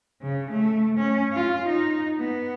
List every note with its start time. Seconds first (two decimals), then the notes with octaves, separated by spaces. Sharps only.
0.22 C#3
0.52 A3
0.99 C#4
1.33 F4
1.69 D#4
2.18 B3